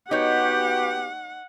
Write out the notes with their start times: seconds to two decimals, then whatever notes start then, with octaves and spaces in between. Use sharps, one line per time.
0.11 B3 D#4 F#4 G4 C#5 F#5